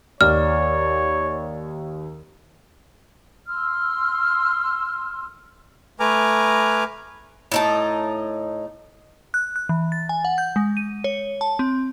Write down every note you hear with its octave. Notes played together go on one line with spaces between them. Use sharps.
D#2 C#5 D5 F6
C6 E6 F6
A3 B4 G#5 A#5 D6 F6
A2 D#4 A5
F#6
F#6
E3
A6
G#5
F#5
G6
G#3
D#7
C#5
A5
C4